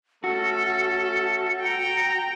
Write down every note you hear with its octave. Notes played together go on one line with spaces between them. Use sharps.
A3 C#4 F#4 A4 C#7
G5 A#5